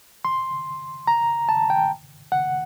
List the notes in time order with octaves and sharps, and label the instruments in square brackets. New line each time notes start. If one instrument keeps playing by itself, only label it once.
[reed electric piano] C6
A#5
A5
G5
F#5